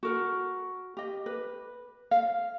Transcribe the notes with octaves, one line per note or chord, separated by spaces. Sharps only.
F#4 A#4 F#5
G4 D#5
B4
F5